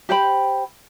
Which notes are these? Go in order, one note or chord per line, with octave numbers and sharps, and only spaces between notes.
G4 C5 G5 B5